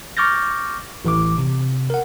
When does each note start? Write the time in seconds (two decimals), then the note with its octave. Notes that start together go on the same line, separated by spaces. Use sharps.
0.17 C#6 D6 F6 G6 A6 A#6
1.05 A1 E3 D6
1.38 C3
1.90 A#4 F#5